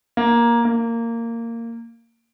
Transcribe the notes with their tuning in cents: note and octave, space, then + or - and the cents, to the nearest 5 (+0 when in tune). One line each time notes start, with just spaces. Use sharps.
A#3 +10
A#3 -15